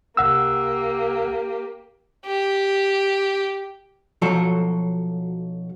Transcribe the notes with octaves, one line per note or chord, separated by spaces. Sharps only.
C2 A#3 G4 F#5 E6
G4
B1 F3 F#3 A4